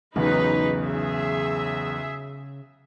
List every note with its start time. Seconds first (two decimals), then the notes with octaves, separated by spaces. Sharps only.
0.16 B1 E2 C#3 D#4 B4
0.85 G#4 E5